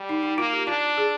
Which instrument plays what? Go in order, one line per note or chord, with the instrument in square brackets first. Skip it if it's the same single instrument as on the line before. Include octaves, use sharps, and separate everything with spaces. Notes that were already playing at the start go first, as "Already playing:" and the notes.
Already playing: [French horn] G3
[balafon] D#4
D#4
[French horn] A#3 [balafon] F4
[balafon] G4
[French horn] D4 [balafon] F4
[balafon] G#4